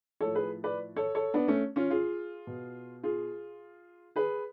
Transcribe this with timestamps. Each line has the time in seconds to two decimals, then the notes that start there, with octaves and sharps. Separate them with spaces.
0.21 A2 F3 A4 C#5
0.35 G#4 B4
0.64 B4 D5
0.96 A4 C#5
1.15 A4 C#5
1.34 B3 D4
1.48 A3 C#4
1.76 C#4 F4
1.90 F4 G#4
2.47 B2
3.03 F4 G#4
4.16 G#4 B4